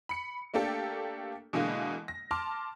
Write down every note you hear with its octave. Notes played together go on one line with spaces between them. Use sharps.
B5 C#7
A3 A#3 D4 G4 A4
B2 D3 E3 G#3 A#3
A#6
A5 C6 D6 F6